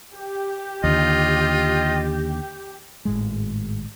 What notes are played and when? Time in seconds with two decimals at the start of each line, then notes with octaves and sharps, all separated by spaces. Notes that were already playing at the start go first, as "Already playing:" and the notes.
0.17 G4
0.84 D#2 D3 F4 D#5
3.05 G#1 A2 G#3